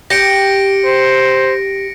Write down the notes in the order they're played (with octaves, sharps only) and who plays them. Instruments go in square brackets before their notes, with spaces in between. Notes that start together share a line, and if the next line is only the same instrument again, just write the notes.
[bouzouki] G4 [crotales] A#6 C#7 D7
[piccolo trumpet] C5